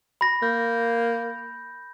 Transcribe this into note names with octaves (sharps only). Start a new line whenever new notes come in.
B5 A#6
A#3 G6